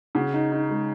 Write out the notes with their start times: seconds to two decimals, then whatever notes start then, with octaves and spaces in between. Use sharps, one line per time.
0.15 C#3 F#4
0.34 D#4
0.52 D#4
0.70 G#3